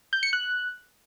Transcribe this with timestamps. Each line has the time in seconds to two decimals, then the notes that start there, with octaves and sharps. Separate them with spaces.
0.13 G6
0.23 C#7
0.33 F#6